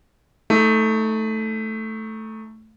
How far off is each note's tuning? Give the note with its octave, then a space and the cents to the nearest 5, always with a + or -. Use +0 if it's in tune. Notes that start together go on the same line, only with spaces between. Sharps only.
A3 +0 D#4 +30